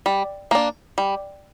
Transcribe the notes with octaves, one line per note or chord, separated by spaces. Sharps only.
G3
A#3 D4
G3